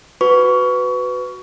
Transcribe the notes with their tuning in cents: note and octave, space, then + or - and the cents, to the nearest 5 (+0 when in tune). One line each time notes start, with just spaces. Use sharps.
F#4 +0 B4 +15 C#6 +25